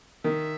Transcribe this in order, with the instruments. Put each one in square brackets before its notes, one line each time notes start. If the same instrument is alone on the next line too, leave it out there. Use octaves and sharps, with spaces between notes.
[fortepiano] D#3 [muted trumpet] E5